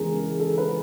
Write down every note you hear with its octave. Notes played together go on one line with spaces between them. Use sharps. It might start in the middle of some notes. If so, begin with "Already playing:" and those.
Already playing: E2 C#3 E3 G#3 G#4 A#4
A4
B4